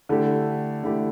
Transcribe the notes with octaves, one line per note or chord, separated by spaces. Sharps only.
D3 A3 E4 G4
D3 A3 E4 G4